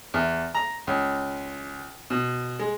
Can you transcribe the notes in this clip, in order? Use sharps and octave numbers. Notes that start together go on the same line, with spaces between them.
E2
A#5
C#2
B2
G#3